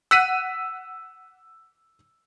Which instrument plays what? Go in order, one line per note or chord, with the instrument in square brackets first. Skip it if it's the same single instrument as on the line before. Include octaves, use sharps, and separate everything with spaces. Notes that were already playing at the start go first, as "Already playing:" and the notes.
[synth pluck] F#5 [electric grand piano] E6 B6 D#7